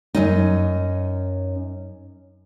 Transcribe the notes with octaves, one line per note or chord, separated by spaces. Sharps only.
F#2 C#4 D#4